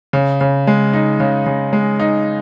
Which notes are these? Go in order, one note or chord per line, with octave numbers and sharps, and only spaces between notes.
C#3
C#3
G#3
D#4
C#3
C#3
G#3
D#4